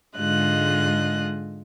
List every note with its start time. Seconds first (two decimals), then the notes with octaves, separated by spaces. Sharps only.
0.17 G#2 D3 G#3 F4 D#5 F#6